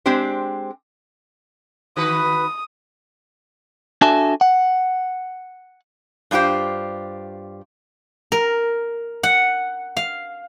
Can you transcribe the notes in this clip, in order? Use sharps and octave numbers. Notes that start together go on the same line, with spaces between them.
G#3 C4 D4 G4 C5
D#3 F#4 B4 D#6
D4 F#4 A4 E5 G#5 A5
F#5
G2 D4 F4 G4 C5
A#4
F#5
F5